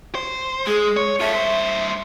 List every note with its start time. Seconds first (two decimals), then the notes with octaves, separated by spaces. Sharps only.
0.15 C5
0.67 G#3 G#4
0.97 C#5
1.20 F4 A4 E5
1.33 G2 C5